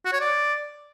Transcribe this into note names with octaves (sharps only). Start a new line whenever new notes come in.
F#4
C#5
D5